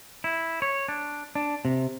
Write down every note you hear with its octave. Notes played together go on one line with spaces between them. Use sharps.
E4
C#5
D4
D4
C3